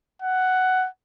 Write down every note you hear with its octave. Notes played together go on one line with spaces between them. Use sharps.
F#5